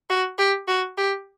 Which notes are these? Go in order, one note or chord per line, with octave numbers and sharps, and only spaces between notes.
F#4
G4
F#4
G4